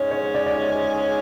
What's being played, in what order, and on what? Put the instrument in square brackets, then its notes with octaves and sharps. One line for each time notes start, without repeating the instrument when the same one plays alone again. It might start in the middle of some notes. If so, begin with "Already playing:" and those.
Already playing: [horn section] G#2 G#3 C#4 [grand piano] C#5
[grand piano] C#5
D5
D5